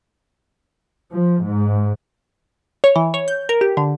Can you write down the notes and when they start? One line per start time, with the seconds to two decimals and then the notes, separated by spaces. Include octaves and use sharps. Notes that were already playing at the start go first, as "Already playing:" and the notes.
1.12 F3
1.44 G#2
2.84 C#5
2.96 E3
3.14 C#5
3.28 G6
3.49 A#4
3.61 G4
3.77 D3